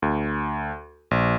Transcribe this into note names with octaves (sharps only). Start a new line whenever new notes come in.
D2
A#1